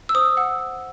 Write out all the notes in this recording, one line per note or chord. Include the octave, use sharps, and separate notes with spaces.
E6
C5 D#6
F#5 E6